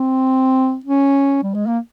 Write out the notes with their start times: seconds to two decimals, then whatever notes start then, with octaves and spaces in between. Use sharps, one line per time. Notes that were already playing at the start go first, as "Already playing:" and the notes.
Already playing: C4
0.85 C#4
1.43 G3
1.54 G#3
1.66 A#3